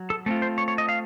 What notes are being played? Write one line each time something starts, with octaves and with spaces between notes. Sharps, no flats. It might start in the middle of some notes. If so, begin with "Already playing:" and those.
Already playing: F#3
A4
A3 C4 F4
C5
C#5
C#5
D#5
F5